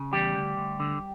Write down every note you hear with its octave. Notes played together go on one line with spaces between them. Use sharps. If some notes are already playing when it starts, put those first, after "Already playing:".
Already playing: C#3
E2 G3 G4
D2
D2
D3